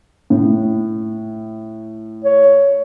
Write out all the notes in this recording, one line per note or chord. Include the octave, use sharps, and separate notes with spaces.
A2
C#5